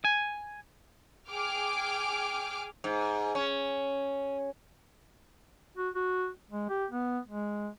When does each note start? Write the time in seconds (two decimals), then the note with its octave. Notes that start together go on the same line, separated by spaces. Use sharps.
0.05 G#5
1.30 G#4 G5 G#5 D6 F6
2.84 G#2
3.35 C#4
5.77 F#4
5.95 F#4
6.51 G#3
6.70 G4
6.91 B3
7.28 G#3